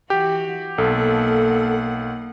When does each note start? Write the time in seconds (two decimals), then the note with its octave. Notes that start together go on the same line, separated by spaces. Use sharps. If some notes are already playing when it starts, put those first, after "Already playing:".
0.10 E3 F#4 G4
0.78 B1 A#3 A4 F#5